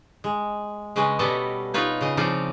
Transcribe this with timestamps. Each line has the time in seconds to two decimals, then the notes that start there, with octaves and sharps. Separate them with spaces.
0.24 G#3
0.96 C#3 G#3 C#4 B4 D#5
1.19 B2 G3 B3 A4 D#5 A5
1.74 D#4 F4 B4 C#5
2.01 C#3 D#5
2.17 C#3 F3 C4 D#4 F4 D5